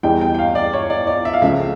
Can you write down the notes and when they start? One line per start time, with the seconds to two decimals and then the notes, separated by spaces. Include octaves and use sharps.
0.03 E2 E3 G3 G5
0.21 G5
0.35 G5
0.39 F5
0.55 D5
0.73 C#5
0.90 D5
1.07 D5
1.25 E5
1.34 F5
1.42 C#2 C#3 F3 A3 E5